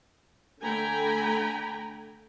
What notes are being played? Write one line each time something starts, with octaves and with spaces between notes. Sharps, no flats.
D3 A3 G5 G#5 A#5 B5